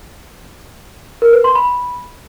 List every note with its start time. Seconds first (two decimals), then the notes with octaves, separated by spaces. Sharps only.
1.22 A#4
1.33 B4
1.44 C6
1.55 B5